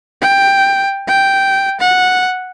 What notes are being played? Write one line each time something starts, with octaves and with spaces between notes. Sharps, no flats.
G5
G5
F#5